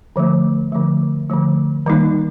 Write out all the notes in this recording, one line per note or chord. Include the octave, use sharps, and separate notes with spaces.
D3 F3 A3
D3 F3 A3
D3 F3 A3
D#3 G3 A#3 D#4